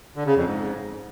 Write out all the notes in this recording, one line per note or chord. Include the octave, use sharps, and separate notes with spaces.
D3
C#3
F2
G#2